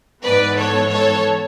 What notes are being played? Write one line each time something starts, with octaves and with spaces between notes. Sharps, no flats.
G#2 E3 B3 B4 D5
A4 C#5
A4 C#5